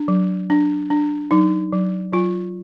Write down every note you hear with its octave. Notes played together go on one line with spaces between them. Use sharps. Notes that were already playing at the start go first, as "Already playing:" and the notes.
Already playing: D4
F#3
D4
D4
F#3 D#4
F#3
F#3 F4